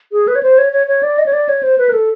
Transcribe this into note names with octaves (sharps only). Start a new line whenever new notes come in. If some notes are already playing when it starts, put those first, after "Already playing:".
G#4
B4
C#5
C5
C#5
C#5
C#5
D5
D#5
C#5
D5
C#5
C5
B4
A#4
A4